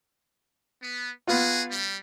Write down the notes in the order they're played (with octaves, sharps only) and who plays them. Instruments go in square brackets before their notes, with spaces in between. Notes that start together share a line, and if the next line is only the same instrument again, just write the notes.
[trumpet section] B3
[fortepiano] B3 F4 [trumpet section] F#4 G#4
[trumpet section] G3